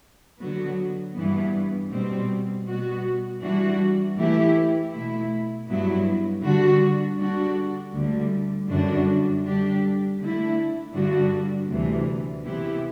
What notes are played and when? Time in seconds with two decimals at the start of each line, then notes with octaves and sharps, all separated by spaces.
0.39 D3 F#3 B3 F#4
1.15 G2 E3 B3
1.90 B2 G3 C4
2.66 B2 G3 B3 F#4
3.41 E3 G3 D4 F#4
4.16 E3 A3 E4 G4
4.91 B2 A3 E4
5.67 G2 F#3 B3 E4
6.42 D3 G3 D4 F#4
7.17 D3 G3 D4 F#4
7.93 D2 D3 G3
8.68 F#2 D3 G3 D4 F#4
9.43 D3 G3 D4 G4
10.18 D3 A3 E4
10.93 G2 D3 G3 D4 F#4
11.70 D2 C3 E3
12.44 C3 E3 B3 E4 G4